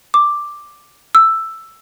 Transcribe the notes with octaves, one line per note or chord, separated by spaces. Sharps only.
D6
E6